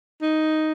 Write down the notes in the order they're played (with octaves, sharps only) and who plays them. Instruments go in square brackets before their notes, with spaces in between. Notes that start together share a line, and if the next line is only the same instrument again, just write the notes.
[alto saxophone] D#4